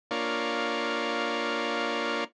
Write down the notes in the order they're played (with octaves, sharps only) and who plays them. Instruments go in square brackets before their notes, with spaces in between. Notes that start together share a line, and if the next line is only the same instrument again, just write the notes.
[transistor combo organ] A#3 D4 F4 C#5